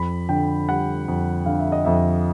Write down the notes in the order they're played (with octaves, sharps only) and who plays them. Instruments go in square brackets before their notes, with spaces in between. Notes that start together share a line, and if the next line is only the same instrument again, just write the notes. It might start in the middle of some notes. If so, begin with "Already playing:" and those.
Already playing: [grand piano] F2 B5
D3 G5
G3 F#5
F2
D3 F5
E5
D#5
F2 E5